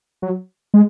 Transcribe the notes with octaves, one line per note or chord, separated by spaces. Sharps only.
F#3
G#3